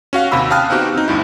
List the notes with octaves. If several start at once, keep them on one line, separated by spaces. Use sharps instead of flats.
C#4 F#4 F5 F#5
D#2 C3 B5 E6
F5 G5 A5 D#6 F6 F#6
B3 C4 D#4 F#4 G4
C4 D#4
D2 G2 E4